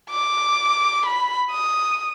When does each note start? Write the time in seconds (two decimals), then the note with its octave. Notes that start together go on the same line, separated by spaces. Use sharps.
0.10 D6
1.06 B5
1.51 D#6